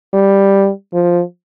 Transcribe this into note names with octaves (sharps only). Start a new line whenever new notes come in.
G3
F3